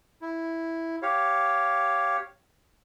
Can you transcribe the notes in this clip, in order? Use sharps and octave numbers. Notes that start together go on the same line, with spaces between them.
E4
G4 C#5 F5